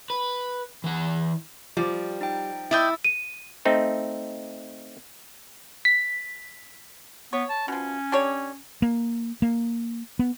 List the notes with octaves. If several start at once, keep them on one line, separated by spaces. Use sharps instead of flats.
B4
E3 F#5
F3 G3
D#4 G5
E4 D5 D#5 G5 E6 A6
D#7
A3 C4 D#4
B6
B3 C#5
A5
B2 F3 C#4
D4 G4 C#5
A#3
A#3
B3